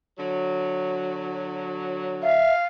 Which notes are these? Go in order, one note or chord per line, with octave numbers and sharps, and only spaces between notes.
D3 F#3
E5 F5